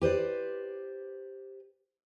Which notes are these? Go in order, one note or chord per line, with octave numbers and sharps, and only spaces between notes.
G4 B4 C5 D5